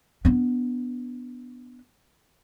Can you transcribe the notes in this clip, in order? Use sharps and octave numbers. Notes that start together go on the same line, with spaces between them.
B3 D4